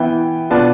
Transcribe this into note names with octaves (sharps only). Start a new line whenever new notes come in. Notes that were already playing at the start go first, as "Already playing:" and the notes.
Already playing: E3 B3 E4 G5
B2 B3 D4 F4 A5